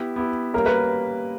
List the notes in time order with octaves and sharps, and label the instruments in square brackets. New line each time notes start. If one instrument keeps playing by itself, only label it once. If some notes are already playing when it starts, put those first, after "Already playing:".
Already playing: [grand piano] B3 E4 G4
B3 E4 G4
[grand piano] G3 A#3 C#4 [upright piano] A#4
[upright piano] B4